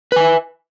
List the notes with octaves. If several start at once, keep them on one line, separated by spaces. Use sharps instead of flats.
B4 E5 G#5